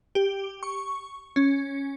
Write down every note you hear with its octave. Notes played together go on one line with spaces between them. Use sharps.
G4
C#6
C#4